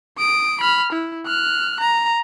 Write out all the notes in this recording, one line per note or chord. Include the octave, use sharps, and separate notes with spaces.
D#6 D7
B5 F6
E4
F6 F#6
A#5